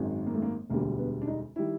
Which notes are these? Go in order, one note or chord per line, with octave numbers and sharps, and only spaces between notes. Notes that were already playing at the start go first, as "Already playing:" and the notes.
Already playing: G#1 F#2 D#3 G#3
A#3
A3
A#3
E1 D2 D3 G3 A#3
B3
D4
D#4
D#3 G3 E4